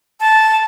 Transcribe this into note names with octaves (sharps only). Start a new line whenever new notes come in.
A5